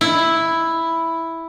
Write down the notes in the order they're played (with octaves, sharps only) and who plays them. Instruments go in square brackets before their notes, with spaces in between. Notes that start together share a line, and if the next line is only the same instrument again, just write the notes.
[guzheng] E4